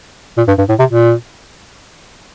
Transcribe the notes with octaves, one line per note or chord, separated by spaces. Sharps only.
A#2
G2
G2
A2
C3
A#2